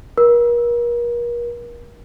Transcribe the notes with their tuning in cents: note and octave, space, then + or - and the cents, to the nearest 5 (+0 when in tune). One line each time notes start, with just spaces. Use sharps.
A#4 +40